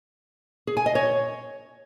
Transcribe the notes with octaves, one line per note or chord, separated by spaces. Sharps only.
G#4
G#5
D#5
C#5